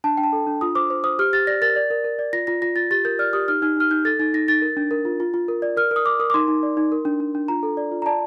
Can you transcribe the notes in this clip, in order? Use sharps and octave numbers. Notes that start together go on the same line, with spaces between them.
D4 A5
D4 G5
A5
A4
D4
F4 D#6
C5 D6
C5
C5 D#6
G4 F6
G4 A6
D5 A#6
A#4 A6
D5
A#4
A#4
D5
F4 A#6
F4 A#6
F4 A#6
F4 A6
G4 A6
A#4 G6
D5 F6
G4 D#6
D#4 F6
D#4 F6
D#4 F6
D#4 G6
A4 A6
D#4 A6
D#4 A#6
D#4 A6
A#4
D4
A#4
F4
F4
F4
A#4
D5
A#4 F6
A#4 D#6
A#4 D6
A#4 D#6
D6
D#4 C6
D#4
D5
D#4
A#4
D4
D4
D4
F4 A#5
A4
D5
F4
A#5
D5 A5